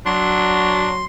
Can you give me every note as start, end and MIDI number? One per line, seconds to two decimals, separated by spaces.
0.06 1.05 54
0.06 0.90 62
0.06 1.05 84